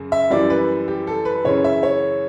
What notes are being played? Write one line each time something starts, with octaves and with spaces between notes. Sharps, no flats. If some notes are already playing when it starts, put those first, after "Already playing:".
Already playing: F#2 C#3
E5
F#2 E3 G3 D5
B4
G4
A4
B4
F#2 C#3 E3 C#5
E5
C#5